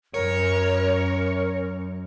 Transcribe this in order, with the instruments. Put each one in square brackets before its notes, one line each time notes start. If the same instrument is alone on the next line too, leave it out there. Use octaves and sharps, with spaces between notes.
[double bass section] F#2 [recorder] A#4 [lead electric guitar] C#5